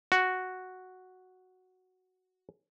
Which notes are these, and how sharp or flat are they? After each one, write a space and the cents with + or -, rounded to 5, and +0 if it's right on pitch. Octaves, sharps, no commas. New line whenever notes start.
F#4 +0